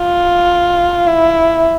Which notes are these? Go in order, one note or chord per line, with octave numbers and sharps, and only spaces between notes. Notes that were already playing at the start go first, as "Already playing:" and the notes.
Already playing: F4
E4